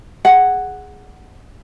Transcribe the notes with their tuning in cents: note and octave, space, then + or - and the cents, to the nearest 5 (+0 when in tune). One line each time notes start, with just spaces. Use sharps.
G#4 -5 F#5 +0